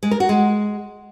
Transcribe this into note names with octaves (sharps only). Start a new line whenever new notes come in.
G#3
A#4
F#4
G#3